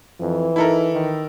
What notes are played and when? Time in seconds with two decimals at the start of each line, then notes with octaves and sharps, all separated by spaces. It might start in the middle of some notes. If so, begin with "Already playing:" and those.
0.21 F2 E3
0.56 D#4 E4 A4 A#4
0.94 D#3